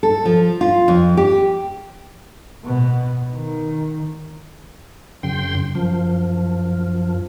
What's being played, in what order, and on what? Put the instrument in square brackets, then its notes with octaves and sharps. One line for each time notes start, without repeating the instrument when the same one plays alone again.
[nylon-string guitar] A4
F3
F4
F2
G4
[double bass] B2
D#3
[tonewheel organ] F#2 C#3 G5 C6
F#2 F3